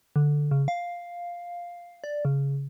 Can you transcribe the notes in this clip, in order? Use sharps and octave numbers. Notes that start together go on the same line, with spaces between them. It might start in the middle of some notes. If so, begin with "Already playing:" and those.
D3
C#3
F5
D5
C#3